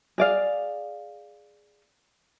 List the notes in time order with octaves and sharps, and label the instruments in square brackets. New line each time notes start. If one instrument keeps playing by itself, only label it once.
[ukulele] G#4 D5 F5